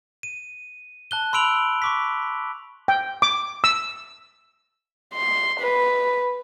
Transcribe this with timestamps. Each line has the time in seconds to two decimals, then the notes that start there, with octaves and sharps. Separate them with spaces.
0.23 D#7
1.11 A5 F#6 G7
1.33 B5 C6 E6 D7 F7 F#7
1.82 C#6 D6 B6
2.88 G5
3.22 D6
3.64 E6
5.14 C6
5.60 B4